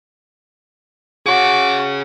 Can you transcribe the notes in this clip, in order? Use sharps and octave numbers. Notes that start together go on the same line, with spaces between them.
F#4 G#4 C#5 D6